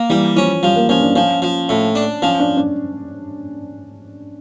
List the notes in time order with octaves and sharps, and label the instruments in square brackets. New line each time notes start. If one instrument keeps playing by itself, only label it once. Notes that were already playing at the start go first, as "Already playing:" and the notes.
Already playing: [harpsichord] A#3
[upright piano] E3 [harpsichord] G3
[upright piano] F3 [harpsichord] C#4
[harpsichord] F3 [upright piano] G3
[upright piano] A#3
[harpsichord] F3 [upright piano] C#4
[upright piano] D4
[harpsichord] F3 [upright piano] C#4
[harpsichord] F3
A2
D4
[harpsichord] F3 [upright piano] C#4
[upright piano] D4
D4